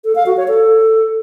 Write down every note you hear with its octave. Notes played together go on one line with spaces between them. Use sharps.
A4
F5
F#4
C#5
A4